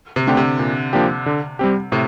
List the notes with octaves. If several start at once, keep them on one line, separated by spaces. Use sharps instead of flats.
C3
D3 A3 C4 G4
C3
A#2
F3 A#3 D4 G4
D3
G3 C4 G4
A2 C3